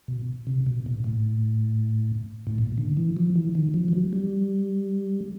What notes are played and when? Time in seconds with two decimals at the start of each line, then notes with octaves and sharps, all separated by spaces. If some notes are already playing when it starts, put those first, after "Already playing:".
0.08 B2
0.47 C3
0.67 B2
0.86 A#2
1.04 A2
2.47 A2
2.58 A#2
2.78 D3
2.97 E3
3.17 F3
3.36 E3
3.55 D#3
3.74 F3
3.88 F3
3.93 F#3
4.13 G3